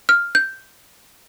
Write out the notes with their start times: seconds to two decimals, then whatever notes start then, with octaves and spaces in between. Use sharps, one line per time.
0.09 F6
0.35 G6